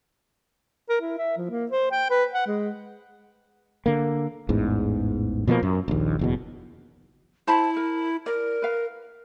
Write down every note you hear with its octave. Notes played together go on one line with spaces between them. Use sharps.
A#4
E4
E5
F3
A#3
C5
G5
B4
F#5
G#3
D3 A#3
A1 E2 G#2
B2 F3 F#3 A#3
F#2
A#1 D#2
F#1 E2 B2
E4 C5 A5 B5
A#4
A#4 D5
B4 F5